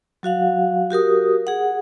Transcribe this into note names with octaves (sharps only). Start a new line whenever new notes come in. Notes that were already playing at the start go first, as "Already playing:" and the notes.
F#3 F#4 F5 F#5
F#4 G4 A#4 D#6
G#4 F#5